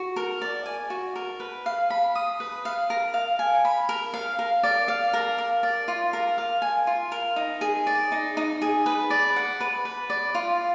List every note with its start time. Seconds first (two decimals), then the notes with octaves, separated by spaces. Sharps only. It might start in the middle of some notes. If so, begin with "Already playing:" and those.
Already playing: F#4
0.16 A#4
0.42 D5
0.66 G#5
0.90 F#4
1.16 A#4
1.40 B4
1.66 F5
1.90 B5
2.15 D#6
2.40 B4
2.65 F5
2.90 A#4
3.14 F5
3.39 G#5
3.65 B5
3.89 A#4
4.14 F5
4.39 A#4
4.63 D5
4.88 F5
5.14 A#4
5.38 A#4
5.63 D5
5.88 F4
6.13 A#4
6.38 F5
6.62 G#5
6.87 F4
7.12 A#4
7.36 D#4
7.61 G#4
7.87 D5
8.12 D#4
8.37 D#4
8.62 G#4
8.86 B4
9.10 D5
9.36 F#5
9.61 B4
9.85 B4
10.10 D5
10.35 F4